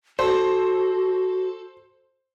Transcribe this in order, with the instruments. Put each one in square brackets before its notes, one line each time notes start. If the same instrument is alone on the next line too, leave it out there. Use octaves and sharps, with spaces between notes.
[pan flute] F#4 [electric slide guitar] A4 [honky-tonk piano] C5